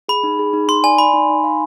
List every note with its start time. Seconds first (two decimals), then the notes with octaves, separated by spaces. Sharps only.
0.09 G#4 B5
0.24 D#4
0.39 G#4
0.53 D#4
0.68 D#4 C6
0.84 D5 G#5
0.98 D5 B5
1.14 D#4
1.29 D#4
1.44 F5